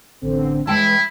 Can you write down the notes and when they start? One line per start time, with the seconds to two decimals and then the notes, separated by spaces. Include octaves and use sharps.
0.21 A1 D3 C4
0.67 E3 G#3 E4 G5 A5